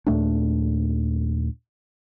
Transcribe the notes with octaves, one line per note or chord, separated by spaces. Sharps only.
D#2 A#2 A3 D4